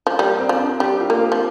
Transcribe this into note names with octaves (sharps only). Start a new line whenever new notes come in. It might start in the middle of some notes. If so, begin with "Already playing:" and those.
F3
G3 A#3
C4
F3
D4
G3 G4
F4
A#3
C4
F3